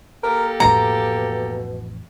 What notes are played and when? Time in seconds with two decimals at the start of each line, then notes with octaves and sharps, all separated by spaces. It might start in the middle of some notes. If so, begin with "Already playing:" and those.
0.23 A#3 G4 A4 A#4
0.60 A1 F2 B2 A#5